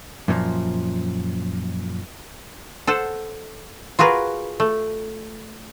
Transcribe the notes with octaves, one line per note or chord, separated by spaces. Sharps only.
F#2 A#2 D#3 F3
A4 C5 F#5
F4 F#4 G#4 A#4 B4
A3